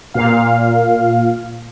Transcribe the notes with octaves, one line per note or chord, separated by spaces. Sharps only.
A#2 F5